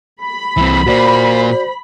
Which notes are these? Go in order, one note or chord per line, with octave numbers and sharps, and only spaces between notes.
B5
C2 E3 C4
A#2 A#3 F#4 C5 D5